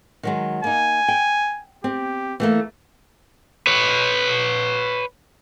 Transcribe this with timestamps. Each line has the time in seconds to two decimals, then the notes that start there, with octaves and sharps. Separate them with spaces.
0.23 D#3 F#3 G#3
0.64 A#3 D#4 G#5
1.08 G5
1.84 C4 G4
2.40 E3 A3 A#3
3.67 B4 C#5